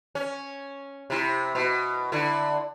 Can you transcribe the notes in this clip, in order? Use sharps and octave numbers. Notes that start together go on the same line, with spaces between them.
C#4
C3 E4
B2
D3 E4